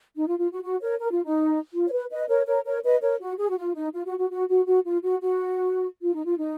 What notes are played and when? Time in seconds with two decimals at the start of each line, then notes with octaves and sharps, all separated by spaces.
0.16 D#4
0.27 F4
0.39 F4
0.52 F#4
0.63 F#4
0.81 A#4 C#5
1.00 A#4
1.12 F4
1.24 D#4
1.73 F4
1.88 C#5
1.92 B4
2.11 B4 D#5
2.29 A#4 C#5
2.46 A#4 C#5
2.65 A#4 C#5
2.83 B4 D#5
3.02 A#4 C#5
3.20 F#4
3.38 G#4
3.50 F#4
3.57 F4
3.75 D#4
3.93 F4
4.06 F#4
4.18 F#4
4.30 F#4
4.49 F#4
4.66 F#4
4.85 F4
5.03 F#4
5.21 F#4
6.02 F4
6.14 D#4
6.25 F4
6.38 D#4